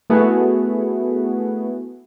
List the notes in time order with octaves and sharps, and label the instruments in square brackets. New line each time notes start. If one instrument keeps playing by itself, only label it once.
[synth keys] A3 B3 E4 F#4 G#4